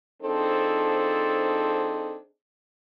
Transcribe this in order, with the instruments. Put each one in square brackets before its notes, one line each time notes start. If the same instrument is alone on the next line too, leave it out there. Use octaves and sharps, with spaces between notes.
[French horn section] F3 C4 D4 D#4 G#4 A4